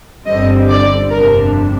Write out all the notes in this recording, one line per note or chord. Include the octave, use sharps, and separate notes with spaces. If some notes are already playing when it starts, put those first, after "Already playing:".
G1 G2 D3 G3 C4 D#5
D5
G1 F2 C3 G3 D4 A#4